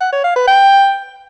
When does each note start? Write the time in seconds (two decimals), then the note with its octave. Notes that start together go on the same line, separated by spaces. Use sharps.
0.01 F#5
0.13 C#5
0.24 F5
0.36 B4
0.48 G5